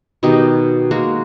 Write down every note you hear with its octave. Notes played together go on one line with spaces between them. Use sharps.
B2 D#3 D#4 G4
G#3 A#3 F#4